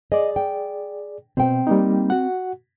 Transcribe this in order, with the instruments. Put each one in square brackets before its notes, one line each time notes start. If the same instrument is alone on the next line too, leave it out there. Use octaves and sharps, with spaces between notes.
[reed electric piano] G#4 D5 [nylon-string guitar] D#5
[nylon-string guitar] G5
[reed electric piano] B2 [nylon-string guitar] C4 G5
[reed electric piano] G3 A#3 D#4
F#4 F#5